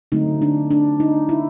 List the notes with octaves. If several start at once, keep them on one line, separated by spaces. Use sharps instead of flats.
D3 F#3 A3 C4 D#4
D4
D4
D#4
E4